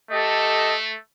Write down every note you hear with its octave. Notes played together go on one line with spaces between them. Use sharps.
A3 G4 A4 D#5